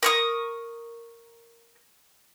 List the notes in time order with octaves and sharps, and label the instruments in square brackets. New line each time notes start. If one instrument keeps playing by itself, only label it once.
[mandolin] A#4 C#6 D#6